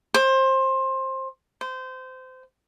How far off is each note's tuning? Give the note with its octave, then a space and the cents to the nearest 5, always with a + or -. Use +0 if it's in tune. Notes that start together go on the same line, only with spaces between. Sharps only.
C5 +20
C5 -25